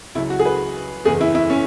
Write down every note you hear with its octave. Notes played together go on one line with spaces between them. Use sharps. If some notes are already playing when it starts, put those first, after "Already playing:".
C#2 C#3 F#3 E4
F#4
G#4
B4
F#1 E2 E3 G#4
E4
E4
C#4